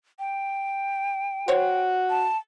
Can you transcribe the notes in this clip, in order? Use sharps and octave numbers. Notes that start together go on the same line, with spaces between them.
G5
F#4 C5 C#5
A5